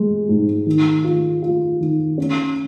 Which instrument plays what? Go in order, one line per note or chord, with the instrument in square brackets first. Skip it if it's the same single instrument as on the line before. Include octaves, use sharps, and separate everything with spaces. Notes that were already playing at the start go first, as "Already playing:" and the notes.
Already playing: [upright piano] G#3
G#2
D#3
F4
F4
D#3
C#4